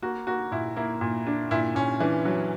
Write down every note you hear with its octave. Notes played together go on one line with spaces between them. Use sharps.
A#3 F#4
A#3 F#4
A#2 E4
A#3 E4
A#2
D4
A#2 E4
A#2 C#4
E3 D4
F#3 D4